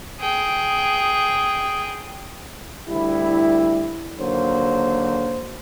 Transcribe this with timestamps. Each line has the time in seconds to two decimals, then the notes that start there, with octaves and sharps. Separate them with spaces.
0.20 G#4 G5
2.89 D2 G3 E4
4.19 D#2 D3 F#3 A#3 C5